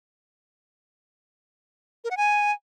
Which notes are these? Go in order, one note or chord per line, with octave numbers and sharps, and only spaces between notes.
A#4
F#5
G#5